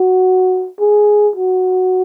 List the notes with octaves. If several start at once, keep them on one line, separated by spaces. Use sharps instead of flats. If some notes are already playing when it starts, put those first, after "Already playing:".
Already playing: F#4
G#4
F#4